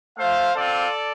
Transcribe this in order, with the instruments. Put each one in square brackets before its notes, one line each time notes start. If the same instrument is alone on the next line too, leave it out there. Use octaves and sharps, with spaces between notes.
[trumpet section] A3 F4 C5 F5
C4 F4 A4 D5